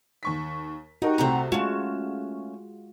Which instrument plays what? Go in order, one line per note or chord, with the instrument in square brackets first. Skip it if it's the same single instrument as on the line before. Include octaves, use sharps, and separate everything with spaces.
[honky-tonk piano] D#2 C#6 B6
[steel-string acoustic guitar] D#4 [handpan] F#4 [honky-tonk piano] G4 A#4 D#5
[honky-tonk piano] C2 C3 A3 [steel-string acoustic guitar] C4 F#5 A#5
[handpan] G#3 F4 F#4 [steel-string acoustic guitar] A3 C#4 [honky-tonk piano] E7